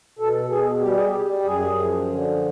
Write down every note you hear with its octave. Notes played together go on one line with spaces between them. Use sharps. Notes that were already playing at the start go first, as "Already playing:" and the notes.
B2 A4
B2 G#4
G3 G4
G#4
G4
G3
F#2 G#4
F3
D3